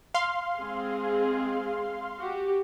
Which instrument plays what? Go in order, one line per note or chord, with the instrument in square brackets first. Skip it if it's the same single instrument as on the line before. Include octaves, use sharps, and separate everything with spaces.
[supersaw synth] F5 C6
[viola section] G#3 C4 G#4
F#4 G4